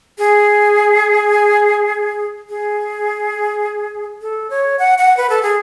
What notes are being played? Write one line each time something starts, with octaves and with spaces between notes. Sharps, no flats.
G#4
G#4
A4
C#5
F#5
F#5
B4
A4
G#4